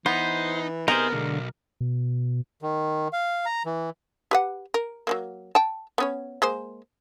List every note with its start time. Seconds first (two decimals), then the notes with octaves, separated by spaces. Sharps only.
0.06 E3 B3 D#4 C5
0.88 C3 B3 D#4 G#4 A#4 C5
1.12 B1 D3 G#3
1.81 B2
2.62 D#3
3.13 F5
3.46 A#5
3.66 E3
4.31 G4 B4 F#5
4.74 A#4
5.07 F#3 A3 A#3
5.55 G5 A5
5.98 B3 C#4 C#5
6.42 G#3 A#3 C5